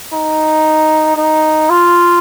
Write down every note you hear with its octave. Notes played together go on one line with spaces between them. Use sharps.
D#4
D#4
F4